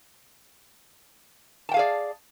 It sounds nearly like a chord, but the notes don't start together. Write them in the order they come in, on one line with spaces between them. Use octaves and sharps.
A5 G5 F5 G#4 D5